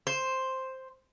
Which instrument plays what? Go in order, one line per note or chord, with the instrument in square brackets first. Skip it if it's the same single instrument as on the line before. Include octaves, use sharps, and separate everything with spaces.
[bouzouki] C5